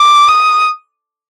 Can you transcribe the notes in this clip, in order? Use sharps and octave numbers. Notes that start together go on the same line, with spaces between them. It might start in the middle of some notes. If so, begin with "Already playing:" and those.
Already playing: D6
D#6